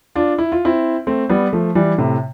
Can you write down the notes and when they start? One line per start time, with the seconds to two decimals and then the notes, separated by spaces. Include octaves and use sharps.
0.15 D4 F4
0.38 E4
0.52 F4
0.65 C4 E4
1.07 A3 C4
1.29 G3 B3
1.53 F3 A3
1.75 E3 G3
1.98 A2 C3